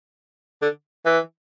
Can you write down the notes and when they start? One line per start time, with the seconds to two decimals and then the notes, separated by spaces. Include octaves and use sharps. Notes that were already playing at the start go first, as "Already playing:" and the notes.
0.62 D3
1.06 E3